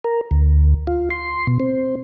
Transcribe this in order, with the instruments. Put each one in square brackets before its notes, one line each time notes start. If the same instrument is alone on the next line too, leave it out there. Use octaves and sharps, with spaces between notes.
[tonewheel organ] A#4
D2
F4
C6
B2
C4